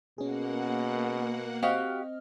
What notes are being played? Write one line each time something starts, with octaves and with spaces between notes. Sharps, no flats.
B2 A#3 C#4 G#4 F#5
C4 F#4 G4 D#5 F5 F6